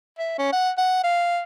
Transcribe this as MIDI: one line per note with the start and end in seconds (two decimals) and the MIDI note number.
0.19 0.35 76
0.38 0.51 61
0.53 0.71 78
0.78 0.99 78
1.04 1.42 77